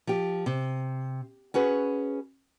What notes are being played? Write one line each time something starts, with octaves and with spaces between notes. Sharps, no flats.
F3 G4
C3
C#4 F#4 G#4 B4